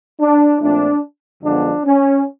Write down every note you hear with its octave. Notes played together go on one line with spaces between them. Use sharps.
D4
A#2 F3 A3 C4 D4
F#2 D3 F3 G#3 B3 D4
C#4